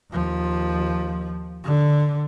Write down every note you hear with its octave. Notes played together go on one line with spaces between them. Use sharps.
D#2 F3
D3